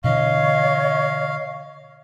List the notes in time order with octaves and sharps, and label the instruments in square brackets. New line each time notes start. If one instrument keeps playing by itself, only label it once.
[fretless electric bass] B2 D3 E3 [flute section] C#5 C#6 [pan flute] D#5 [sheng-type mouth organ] F5